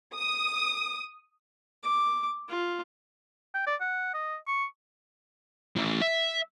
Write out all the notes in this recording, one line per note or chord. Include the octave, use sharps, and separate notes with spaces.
D#6
D6
F4
G5
D5
F#5
D#5
C#6
A2 E3
E5